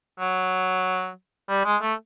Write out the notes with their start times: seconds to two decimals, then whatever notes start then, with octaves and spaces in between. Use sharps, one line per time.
0.20 F#3
1.49 G3
1.65 G#3
1.82 A3